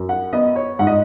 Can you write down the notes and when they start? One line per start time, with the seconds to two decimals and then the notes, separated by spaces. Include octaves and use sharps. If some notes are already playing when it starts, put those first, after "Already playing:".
Already playing: F#2
0.09 F#5
0.33 B3 D#5
0.56 C#5
0.79 G#2 F#5
0.87 D#5